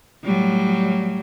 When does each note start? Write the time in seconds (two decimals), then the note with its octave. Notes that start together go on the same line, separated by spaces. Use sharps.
0.25 A2 F#3 G3